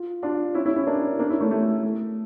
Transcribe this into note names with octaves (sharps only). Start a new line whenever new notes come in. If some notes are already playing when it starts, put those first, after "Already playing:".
Already playing: F4
D4 F4
C#4 E4
C#4 E4
C#4 E4
A#3 D4
A#3 D4
C#4 E4
A3 C#4
A3
A3